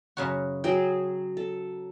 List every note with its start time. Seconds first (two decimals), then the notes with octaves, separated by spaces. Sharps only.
0.17 F#2 C#3 F#4
0.64 F#3 F#4 G#4 G5
1.37 A4